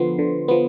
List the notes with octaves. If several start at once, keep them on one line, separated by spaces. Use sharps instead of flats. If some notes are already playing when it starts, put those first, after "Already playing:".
Already playing: D3 F3 B3 C6
D3
F3 B3